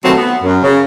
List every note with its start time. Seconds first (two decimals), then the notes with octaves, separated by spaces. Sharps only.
0.05 B2 D#3 F3 F#3 A3 C4
0.18 B3
0.43 F#2
0.63 C#3